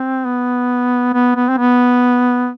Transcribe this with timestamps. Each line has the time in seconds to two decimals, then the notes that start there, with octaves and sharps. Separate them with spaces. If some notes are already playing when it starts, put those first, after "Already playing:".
Already playing: C4
0.25 B3
1.14 B3
1.36 B3
1.49 C4
1.58 B3